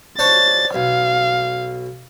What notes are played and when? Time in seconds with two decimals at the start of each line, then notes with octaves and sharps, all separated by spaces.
0.19 D4 C5 C#5 A6
0.74 B1 F5